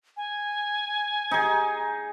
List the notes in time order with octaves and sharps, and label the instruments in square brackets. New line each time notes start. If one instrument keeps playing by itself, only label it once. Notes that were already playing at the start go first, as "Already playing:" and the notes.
[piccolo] G#5
[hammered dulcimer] D#4 G#4